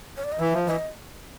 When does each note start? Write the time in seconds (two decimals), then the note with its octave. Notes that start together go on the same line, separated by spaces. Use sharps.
0.17 C#5
0.24 D5
0.32 D#5
0.39 E3 E5
0.53 F3
0.67 E3 D#5